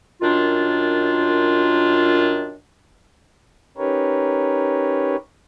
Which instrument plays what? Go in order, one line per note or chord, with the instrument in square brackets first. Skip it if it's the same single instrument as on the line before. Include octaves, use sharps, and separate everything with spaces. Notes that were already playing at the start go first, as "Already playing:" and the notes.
[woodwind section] F#2 D#3 D4 F4
[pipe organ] C#4 D#4 G4 A#4 B4 C#5